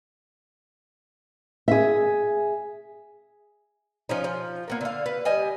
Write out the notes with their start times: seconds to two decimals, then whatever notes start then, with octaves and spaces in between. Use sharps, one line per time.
1.68 G#4 E5
4.09 F3 C#4 D#4
4.24 F3
4.68 A#3 B3 A#4
4.81 D3 F5
5.06 B4
5.25 G3 D#5 G#5